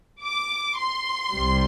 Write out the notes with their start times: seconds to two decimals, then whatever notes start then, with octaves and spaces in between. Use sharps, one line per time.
0.21 D6
0.78 C6
1.33 C2 C3 G3